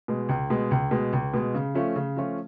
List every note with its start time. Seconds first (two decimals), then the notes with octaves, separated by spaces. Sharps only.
0.08 B2 G#3
0.29 C#2
0.50 B2 G#3
0.71 C#2
0.91 B2 G#3
1.13 C#2
1.34 B2 G#3
1.55 C#3
1.75 F3 A3 C#4 F4
1.96 C#3
2.17 F3 A3 C#4 F4